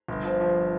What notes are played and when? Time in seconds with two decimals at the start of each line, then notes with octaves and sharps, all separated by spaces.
0.08 G1
0.25 F3
0.41 F3